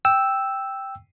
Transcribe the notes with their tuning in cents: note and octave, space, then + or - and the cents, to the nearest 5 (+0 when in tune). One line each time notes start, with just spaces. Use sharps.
G5 +0 E6 +0